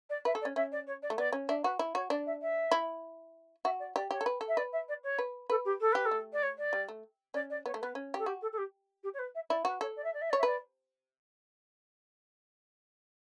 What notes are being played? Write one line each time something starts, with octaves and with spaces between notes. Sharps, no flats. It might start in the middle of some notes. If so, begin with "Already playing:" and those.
D5
B4 E5
A4
D5
C#4
C#4 E5
D5
C#5
D5
A3
B3 D5
C#4
D4 E5
F#4 B4
E4
F#4 C#5
D4 D5
E5
E5
E4
F#4 E5
D5
G4 D5
G4 C#5
A4
B4
A4
E5
B4 D5
E5
D5
C#5
B4
A4 B4
G4
A4
G4 B4
A4
A3
D5
C#5
D5
G3
A3
C#4 D5
D5
B3 C#5
A3
B3 B4
C#4
G4 A4
F#4 G4
A4
A4
G4
G4
C#5
B4
E5
E4 D5
F#4 B4
A4 C#5
D5
E5
D5
E5
C#5 D5
E5
B4 D5